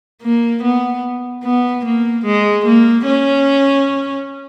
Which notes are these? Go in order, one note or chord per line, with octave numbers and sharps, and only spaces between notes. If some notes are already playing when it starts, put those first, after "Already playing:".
A#3
B3
B3
A#3
G#3
A#3
C#4